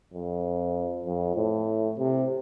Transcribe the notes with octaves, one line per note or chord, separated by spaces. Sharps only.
F2
F2
A2
C3